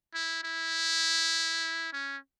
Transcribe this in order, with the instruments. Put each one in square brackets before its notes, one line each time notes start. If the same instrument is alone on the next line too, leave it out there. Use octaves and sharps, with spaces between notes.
[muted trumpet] E4
E4
C#4